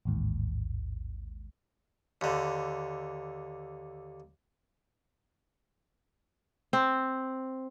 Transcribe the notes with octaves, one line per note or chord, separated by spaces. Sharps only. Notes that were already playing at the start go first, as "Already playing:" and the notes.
A1 D#2 G#2
D#2 D3
C4